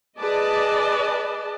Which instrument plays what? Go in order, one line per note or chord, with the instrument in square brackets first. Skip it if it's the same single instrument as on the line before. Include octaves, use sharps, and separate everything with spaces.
[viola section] G#4 B4 D5 D#5 A5